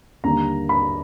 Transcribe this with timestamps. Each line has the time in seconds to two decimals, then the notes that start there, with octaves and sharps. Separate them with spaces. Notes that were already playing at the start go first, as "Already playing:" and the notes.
0.24 D#2 D3 G3 A#3 A#5
0.69 B5